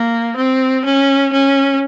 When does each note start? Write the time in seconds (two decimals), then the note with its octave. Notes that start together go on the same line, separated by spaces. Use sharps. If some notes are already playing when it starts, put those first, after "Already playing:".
Already playing: A#3
0.36 C4
0.85 C#4
1.33 C#4